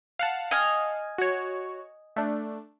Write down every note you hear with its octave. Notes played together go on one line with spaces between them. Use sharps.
F5 F#5 A5
D#5 G#5 F6
F#4 C#5
A3 D4